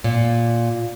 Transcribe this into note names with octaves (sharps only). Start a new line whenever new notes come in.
A#2